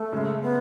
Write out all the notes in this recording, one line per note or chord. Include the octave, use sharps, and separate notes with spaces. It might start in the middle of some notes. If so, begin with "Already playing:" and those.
Already playing: A3
F#2 C#3 G#3
B3